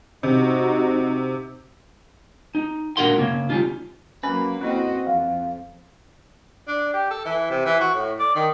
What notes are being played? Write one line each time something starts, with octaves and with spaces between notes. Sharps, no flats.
C3 D#4 F#4
D#4
A#2 D4 F#4 A#4 F#5 C6
C#3 A#3 C#4
G3 C#4 D#4 F4
F#3 A#3 C#4 B4
A#3 C4 E4 F#4 A4 D#5
F2 F5
D4
G4
A4
E3
C3
E3
F#4
A2
D5
D#3